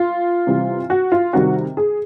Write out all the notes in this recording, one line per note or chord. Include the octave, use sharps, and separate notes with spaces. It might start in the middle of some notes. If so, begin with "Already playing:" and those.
Already playing: F4
C3 E3 G3
F#4
F4
C3 D#3 G3 F#4
G#4